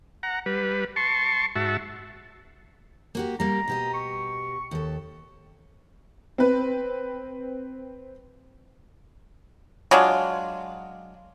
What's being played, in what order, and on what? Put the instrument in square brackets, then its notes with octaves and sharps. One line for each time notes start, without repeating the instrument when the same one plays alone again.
[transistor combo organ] F#5 A#5
G3 B4
A5 C6 C#6
G#2 F#4 E5 A5
[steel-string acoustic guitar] A#3 F#4 G4
[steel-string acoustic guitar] G3 A#3 [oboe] A#5
[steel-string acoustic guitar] B2 G4 D#5
[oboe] C#6
[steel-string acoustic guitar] D#2 A4
[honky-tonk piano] C4 B4
[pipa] F#3 G#3 D4 F4